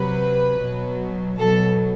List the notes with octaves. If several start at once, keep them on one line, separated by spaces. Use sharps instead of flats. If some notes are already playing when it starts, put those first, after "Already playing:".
Already playing: C3 F#3 B4
B2 F#3
B2 F#3 A4